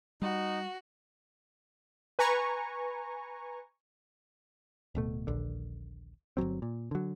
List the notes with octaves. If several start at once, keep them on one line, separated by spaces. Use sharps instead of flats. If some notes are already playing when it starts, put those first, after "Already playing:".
G3 D#4 F#4
B4 G#5 A#5 C#6
D1 B2 A3
D#1 A#1 D3
G1 E2 F#3 C4
A#2
D3 F#3